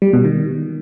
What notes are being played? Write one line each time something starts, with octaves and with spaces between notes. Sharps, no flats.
G3
B2
D#3